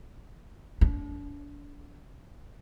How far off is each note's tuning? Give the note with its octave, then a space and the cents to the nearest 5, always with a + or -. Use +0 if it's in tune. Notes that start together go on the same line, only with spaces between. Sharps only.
D4 -35